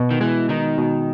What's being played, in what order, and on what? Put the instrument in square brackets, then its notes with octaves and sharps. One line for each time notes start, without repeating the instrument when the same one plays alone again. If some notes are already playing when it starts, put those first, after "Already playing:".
Already playing: [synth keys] B2
[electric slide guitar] D#3
[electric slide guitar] E3 [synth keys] G#3
[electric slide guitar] D#3 [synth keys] D#4
[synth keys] B2